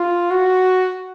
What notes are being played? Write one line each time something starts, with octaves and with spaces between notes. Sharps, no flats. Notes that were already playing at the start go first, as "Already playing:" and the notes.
Already playing: F4
F#4